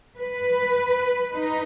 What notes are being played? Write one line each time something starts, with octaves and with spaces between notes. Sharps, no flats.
B4
D#4